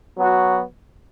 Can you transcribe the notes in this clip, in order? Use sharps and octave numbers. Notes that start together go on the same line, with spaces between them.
F#3 B3 F#4